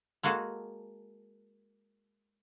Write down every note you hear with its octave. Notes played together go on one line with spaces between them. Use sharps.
G#3 A#3 F#4 G#4 A4